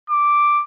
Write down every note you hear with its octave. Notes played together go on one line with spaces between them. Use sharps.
D6